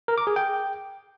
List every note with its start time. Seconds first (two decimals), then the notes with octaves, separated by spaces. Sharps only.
0.08 A#4
0.18 D6
0.27 G#4
0.36 G5